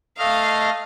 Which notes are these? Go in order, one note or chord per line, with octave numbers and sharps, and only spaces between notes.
A3 D#5 F5 F6